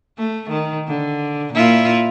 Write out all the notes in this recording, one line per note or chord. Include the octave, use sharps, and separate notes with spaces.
A3
D#3
D3
A#2 E4 F4